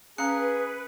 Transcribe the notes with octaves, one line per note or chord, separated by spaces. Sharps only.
C#4 G#4 B4 F5 A#5 F#6 C#7